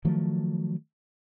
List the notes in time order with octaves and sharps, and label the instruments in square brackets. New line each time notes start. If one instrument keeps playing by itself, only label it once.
[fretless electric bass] D#3 F3 F#3 A3